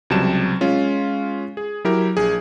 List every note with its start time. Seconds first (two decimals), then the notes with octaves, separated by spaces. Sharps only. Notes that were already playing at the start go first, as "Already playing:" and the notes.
0.10 C#2 C3 F#3 G3 A5 E7
0.61 G#3 C#4 F4
1.57 G#4
1.85 F#3 E4 G4 A#4
2.17 A#1 G#4